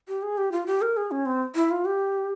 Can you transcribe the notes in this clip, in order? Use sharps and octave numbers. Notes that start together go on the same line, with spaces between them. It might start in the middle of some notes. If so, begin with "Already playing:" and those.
G4
G#4
G4
F4
G4
A#4
G#4
C#4
C4
E4
F4
G4